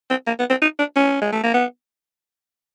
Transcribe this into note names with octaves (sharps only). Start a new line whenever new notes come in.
C4
A#3
B3
C4
D#4
D4
C#4
G#3
A3
A#3
B3